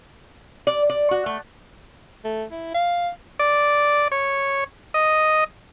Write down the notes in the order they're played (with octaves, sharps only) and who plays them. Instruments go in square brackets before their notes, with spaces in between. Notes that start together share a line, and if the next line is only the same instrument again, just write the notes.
[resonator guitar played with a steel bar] D5
D5
F#4
A3
[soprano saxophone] A3
E4
F5
[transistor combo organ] D5
C#5
D#5